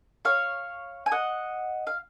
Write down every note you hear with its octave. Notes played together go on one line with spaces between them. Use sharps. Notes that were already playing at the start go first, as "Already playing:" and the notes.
C#5 F5
G#5
D#5 F#5
F5